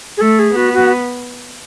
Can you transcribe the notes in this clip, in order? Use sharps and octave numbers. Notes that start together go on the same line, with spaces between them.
G#4
A3 A4
G#4
B3 F#4
F#4